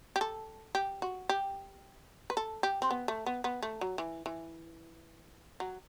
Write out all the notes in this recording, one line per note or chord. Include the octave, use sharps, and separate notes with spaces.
G4
A4
G4
F#4
G4
B4
A4
G4
C4
B3
A3
B3
B3
A3
F#3
E3
E3
F#3